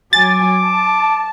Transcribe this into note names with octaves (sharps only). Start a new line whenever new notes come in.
F#3 G#5 D6 A6
A5